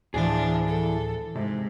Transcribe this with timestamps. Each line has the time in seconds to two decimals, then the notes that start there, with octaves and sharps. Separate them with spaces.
0.14 D2 A2 E3 F3 D4 G#4 A5
0.67 A4
1.35 G#2 C3